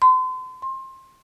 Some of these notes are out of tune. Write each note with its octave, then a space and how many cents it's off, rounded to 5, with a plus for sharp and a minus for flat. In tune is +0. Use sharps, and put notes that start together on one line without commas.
C6 -40
C6 +25